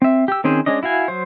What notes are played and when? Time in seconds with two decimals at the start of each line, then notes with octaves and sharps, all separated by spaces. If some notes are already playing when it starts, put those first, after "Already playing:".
0.02 C4 E5
0.28 G4 E6
0.44 D#3 C4 C#4 G#4 C5
0.66 G#3 C#4 D4 D#5
0.83 E4 F#4 F5 G#5
1.08 F#3 C5